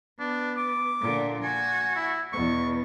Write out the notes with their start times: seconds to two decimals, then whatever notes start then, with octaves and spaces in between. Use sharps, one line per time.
0.20 B3 D4
0.57 D6
1.01 A#2 D3
1.43 F#4 G#5
1.96 E4
2.33 E2 B2 C#6